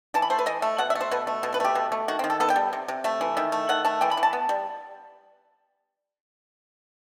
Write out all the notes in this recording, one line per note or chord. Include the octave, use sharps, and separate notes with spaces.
E3 A5
B5
A3 C5
B4
E3 D#5
A3 E5
B2 F#5
E5
A3
C5
B2 B4
A3
B2
B4
A3 G4
B2
A3
D#3 F#4
C4
D#3
A4
B3 A4
G5
G3
C3
C3
A3 E5
E3
D#3 E5
A3
D#3 F#5
A3 A5
E3 G5
B5
E3
A5
B3
G3